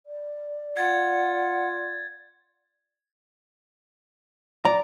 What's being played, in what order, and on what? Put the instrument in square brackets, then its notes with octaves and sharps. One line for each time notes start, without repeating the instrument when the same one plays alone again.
[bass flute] D5
[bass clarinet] F4 [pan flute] F#5 [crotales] G#6 A6
[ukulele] D5 [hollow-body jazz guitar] A#5